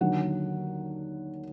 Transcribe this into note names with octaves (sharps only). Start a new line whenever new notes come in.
D#2 D3 F#3 F#5